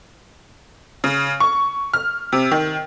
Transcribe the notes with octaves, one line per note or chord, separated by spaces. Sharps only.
C#3
C#6
F6
C3
D#3